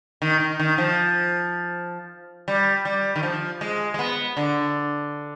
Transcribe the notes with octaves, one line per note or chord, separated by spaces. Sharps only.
D#3
D#3
D#3
F3
G3
G3
D#3
F3
G#3
G#3
B3
D3